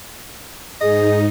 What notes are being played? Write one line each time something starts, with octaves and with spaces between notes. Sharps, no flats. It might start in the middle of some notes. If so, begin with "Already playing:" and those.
G#2 D#4 G#4 D#5